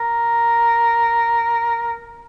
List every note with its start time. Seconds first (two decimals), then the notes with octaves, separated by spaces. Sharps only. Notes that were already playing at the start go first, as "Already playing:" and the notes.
Already playing: A#4